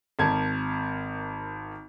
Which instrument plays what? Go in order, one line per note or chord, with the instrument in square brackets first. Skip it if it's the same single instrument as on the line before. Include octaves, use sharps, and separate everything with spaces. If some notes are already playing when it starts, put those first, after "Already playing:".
[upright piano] G#1 A#4 A5 G#6